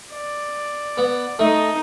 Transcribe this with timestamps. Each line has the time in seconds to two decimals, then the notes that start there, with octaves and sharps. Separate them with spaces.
0.12 D5
0.97 B3
1.39 A3 D#4 D#5